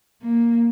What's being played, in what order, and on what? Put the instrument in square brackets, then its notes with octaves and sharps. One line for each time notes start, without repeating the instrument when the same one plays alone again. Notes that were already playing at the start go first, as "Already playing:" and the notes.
[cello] A#3